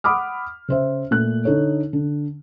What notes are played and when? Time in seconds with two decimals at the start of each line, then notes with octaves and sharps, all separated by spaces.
0.04 F#5 B5 D6 D#6 F6
0.68 C#3 C5 E5
1.11 A#2 A3 F#6
1.45 D3 D#4 A4 C#5
1.93 D3